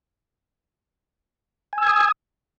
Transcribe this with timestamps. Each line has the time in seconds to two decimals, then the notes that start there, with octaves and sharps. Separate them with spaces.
1.73 G#5
1.78 E6
1.83 G#6
1.88 D#6